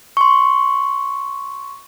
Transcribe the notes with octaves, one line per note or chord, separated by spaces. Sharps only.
C6 C#6